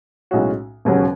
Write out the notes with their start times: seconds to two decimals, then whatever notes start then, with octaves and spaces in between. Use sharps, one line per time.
0.31 B1 A2 G#3 C#4 F#4
0.85 E1 D#2 C#3 F#3 C#4